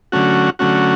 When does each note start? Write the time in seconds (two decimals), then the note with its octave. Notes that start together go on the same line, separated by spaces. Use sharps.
0.12 D3 F#3 A3 C#4 F#4
0.59 D3 F#3 A3 C#4 F#4